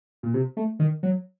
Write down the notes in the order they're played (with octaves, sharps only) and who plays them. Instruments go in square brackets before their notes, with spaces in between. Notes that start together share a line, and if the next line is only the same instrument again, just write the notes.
[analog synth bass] A#2
C3
A3
D#3
F#3